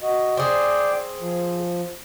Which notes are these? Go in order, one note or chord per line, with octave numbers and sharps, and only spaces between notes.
F#4 D#5
C4 G#4 D5 G5 D6
F3